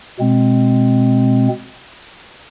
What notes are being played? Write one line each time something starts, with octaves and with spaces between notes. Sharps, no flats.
B2 G#3 C4